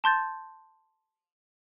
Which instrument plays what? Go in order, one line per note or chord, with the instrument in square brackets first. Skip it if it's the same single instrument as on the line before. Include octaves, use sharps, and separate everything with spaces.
[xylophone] A5 C6 G6 A6